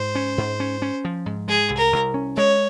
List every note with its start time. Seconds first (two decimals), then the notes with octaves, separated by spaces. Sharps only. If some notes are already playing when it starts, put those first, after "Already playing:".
Already playing: G#2 C5
0.15 C#4
0.38 G#2
0.60 C#4
0.82 C#4
1.05 F3
1.26 G#2
1.48 G#3 G#4
1.70 C2
1.77 A#4
1.93 C2
2.14 C#4
2.37 G#3 C#5